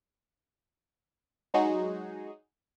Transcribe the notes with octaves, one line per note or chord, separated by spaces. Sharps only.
F#3 G#3 D#4 F#4 G#4